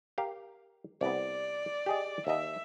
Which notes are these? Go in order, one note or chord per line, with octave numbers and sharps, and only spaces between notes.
G4 A#4 F5
C2 B3 D5
G4 G#4 D#5
D#2 D#5 E5